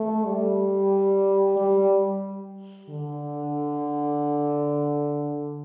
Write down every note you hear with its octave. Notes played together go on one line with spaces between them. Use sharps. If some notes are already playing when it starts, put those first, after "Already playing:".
Already playing: A3
G3
G3
D3